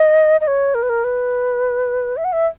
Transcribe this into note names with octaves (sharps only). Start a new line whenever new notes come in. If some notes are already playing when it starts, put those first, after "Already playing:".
Already playing: D#5
D#5
C#5
A#4
B4
A#4
B4
E5
F#5
E5